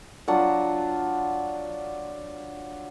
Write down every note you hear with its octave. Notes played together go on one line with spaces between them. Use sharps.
F#3 D4 F4 F#5